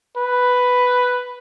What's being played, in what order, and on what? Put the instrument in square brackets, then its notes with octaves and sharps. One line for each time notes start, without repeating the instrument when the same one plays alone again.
[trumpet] B4